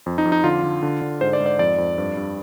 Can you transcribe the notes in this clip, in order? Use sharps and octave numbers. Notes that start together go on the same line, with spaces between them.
F2
D#4
F2
D#4
D3 F4
D3
D3
D3
G#2 C5
D5
G#2
D5
F2 D5
F2
G2
G2